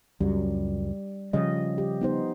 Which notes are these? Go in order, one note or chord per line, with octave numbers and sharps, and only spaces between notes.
C#2 F#2 F#3 G3
C#3 F3 G3 D#5
G4
B3 D#4 C5